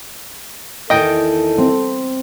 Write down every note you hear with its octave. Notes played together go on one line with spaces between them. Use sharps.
E2 D#3 A4 D#5 G5
C4